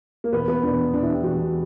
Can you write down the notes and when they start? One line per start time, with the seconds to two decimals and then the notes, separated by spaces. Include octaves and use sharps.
0.24 A#3
0.33 E2 B2 B3
0.48 B3
0.63 E2 B2 D4
0.93 E2 B2 D4
1.03 E4
1.13 G4
1.23 E2 B2 F#4